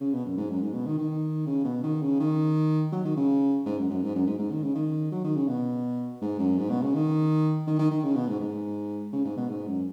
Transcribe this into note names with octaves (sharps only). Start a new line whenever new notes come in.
C#3
B2
F#2
G#2
F#2
G#2
B2
D#3
D#3
C#3
B2
D#3
C#3
D#3
F#3
D#3
C#3
G#2
F#2
F#2
G#2
F#2
G#2
G#2
D#3
C#3
D#3
F#3
D#3
C#3
B2
G#2
F#2
G#2
B2
C#3
D#3
D#3
D#3
D#3
C#3
B2
G#2
G#2
C#3
G#2
B2
G#2
F#2